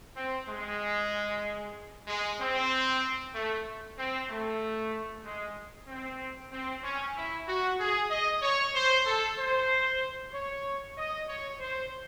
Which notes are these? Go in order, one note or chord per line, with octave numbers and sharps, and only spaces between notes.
C4
G#3
G#3
C4
A3
C4
A3
G#3
C4
C4
C#4
E4
F#4
G#4
D#5
C#5
C5
A4
C5
C#5
D#5
C#5
C5